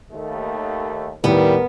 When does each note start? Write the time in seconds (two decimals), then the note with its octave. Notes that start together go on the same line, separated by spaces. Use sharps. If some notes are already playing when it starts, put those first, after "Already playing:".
0.12 D#2 A3
1.24 D#2 A2 G3 B3 A#4